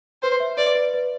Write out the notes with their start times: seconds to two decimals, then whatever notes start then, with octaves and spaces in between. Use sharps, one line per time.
0.22 B4 C5
0.40 E5
0.57 B4 D5
0.75 B4
0.94 B4